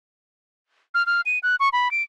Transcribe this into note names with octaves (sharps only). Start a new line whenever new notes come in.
F6
F6
D#7
F#6
C#6
B5
D7